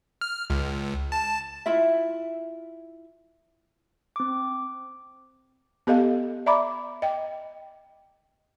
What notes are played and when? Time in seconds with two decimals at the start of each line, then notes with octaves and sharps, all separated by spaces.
0.21 F6
0.50 C#2
1.12 A5
1.66 E4 F4 E5
4.16 C4 D6
5.87 B3 G4 A4 D#5 F5
6.46 D5 E5 A#5 B5 D6
7.02 D#5 G5